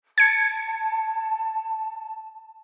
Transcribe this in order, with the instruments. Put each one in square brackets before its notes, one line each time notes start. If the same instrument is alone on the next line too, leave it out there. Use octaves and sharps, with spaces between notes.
[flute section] A5 [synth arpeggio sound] G#6 C#7